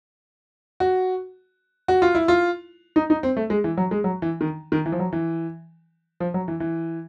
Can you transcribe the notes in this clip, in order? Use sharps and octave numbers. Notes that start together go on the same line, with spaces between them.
F#4
F#4
F4
E4
F4
D#4
D#4
C4
A3
G#3
E3
F#3
G#3
F#3
E3
D#3
D#3
E3
F3
F#3
E3
F3
F#3
E3
E3